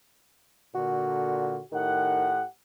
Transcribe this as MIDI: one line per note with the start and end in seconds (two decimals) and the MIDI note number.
0.75 1.58 46
0.75 1.58 50
0.75 1.62 66
1.72 2.42 45
1.72 2.32 51
1.72 2.42 67
1.72 2.42 78